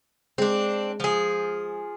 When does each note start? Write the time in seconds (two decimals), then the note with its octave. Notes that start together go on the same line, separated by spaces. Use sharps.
0.38 G#3 C4 D4
1.00 F3 G#4